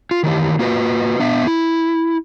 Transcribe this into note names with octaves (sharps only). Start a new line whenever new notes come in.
F4
D#3 E3 G4
A#3 F4 F#4 B4
B3 D4 E5
E4